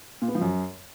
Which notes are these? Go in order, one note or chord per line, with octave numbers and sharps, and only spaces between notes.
A#2
B3
F3
F#2